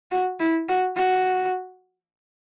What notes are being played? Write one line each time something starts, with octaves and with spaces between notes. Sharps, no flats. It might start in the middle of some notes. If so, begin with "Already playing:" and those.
F#4
E4
F#4
F#4